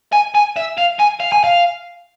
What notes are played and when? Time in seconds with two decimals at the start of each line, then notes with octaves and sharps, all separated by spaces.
0.13 G#5
0.35 G#5
0.56 E5
0.78 F5
1.00 G#5
1.20 F5
1.32 G#5
1.44 F5